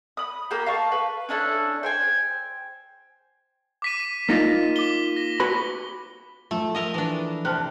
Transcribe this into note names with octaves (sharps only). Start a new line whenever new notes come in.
B5 D#6
A#3 G4
F5 A5 C#6
B4
C#4 D4 E4 A4
C5 G5 G#5
D6 B6 D#7
A#3 D#4 F4
D6 G7
A#6
F#4 B4 B5
F3 A3
A3 A#4 D#5
E3 D4
C3 A5 F6 F#6